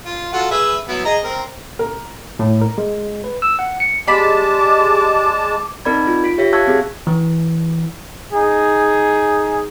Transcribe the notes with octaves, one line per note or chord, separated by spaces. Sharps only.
F4
F4 F#4 A4
G#4 B4 E5
F#3 B3 E4
G#4 D#5 A#5
C4 A#4
A#4
A2
A#4
G#3
B4
E6
F#5
C#7
G#3 G4 D5 A5 B5 D6
C4 D#4 A#4 D5 B5 G#6
F4
F4 B6 D7
G4 C#5 E5 A#6 B6
F5 A5 C#6 E6 F#6 G#6
C4 F#4 G#4
E3
D#4 G#4